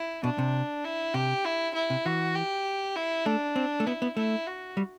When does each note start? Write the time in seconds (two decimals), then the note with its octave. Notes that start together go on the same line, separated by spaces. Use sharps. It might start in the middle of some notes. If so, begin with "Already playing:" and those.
Already playing: E4
0.24 B2 D4
0.38 C3
0.84 E4
1.14 C3 G4
1.45 E4
1.75 E4
1.90 C3
2.05 E3 F#4
2.35 G4
2.96 E4
3.26 A3 D4
3.56 C4
3.80 A3
3.86 B3 E4
4.02 B3
4.17 A3 E4
4.47 F#4
4.77 G3